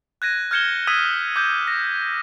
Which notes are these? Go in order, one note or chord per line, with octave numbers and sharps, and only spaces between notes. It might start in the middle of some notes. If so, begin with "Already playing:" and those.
F#6 G#6 A#6 D#7
F6 G6 G#6 C#7 E7 G7
D#6 E6 G#6 A#6 B6 D#7
D6 G6
A#6